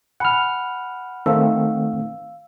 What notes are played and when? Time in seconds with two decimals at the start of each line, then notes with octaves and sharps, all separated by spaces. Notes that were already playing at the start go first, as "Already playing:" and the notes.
0.20 F#5 G#5 B5 F6
1.26 D#3 A3 C4 F5 E6